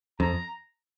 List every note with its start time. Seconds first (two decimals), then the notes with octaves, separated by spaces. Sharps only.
0.20 F2 A#5